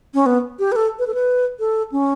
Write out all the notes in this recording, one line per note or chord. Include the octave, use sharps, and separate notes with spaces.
C#4
B3
G4
B4
A4
B4
A4
B4
A4
C#4